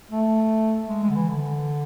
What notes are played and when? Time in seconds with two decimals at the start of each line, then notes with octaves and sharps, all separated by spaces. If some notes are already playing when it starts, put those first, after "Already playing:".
0.10 A3
0.89 G#3
1.03 G#3
1.09 D3
1.16 E3
1.29 D3